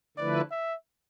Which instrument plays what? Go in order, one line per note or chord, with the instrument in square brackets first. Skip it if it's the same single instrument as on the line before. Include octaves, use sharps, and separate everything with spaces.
[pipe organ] D3 F3 A3 E4 B4 [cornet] D5
[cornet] E5